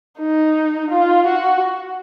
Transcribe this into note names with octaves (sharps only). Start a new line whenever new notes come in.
D#4
F4
F#4